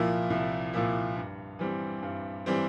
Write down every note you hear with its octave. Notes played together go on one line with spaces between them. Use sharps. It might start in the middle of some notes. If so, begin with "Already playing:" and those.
Already playing: C2 A#2 F3 A#3 E4
C2
A#2 F3 A#3 E4
G2
E3 G3 C4
G2
E3 G3 C4